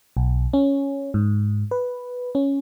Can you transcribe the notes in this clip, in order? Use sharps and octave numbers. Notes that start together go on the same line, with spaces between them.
B1
C#4
G#2
B4
C#4